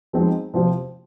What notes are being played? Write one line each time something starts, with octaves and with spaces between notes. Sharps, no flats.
F3 G#3 C4 D#4 F#4
C3 F3 C4 F4 C5